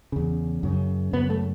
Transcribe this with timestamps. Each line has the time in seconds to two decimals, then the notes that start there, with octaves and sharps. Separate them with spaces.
0.12 E2 C#3
0.63 F#2 C#3
1.13 F#2 C#3 B3
1.30 A3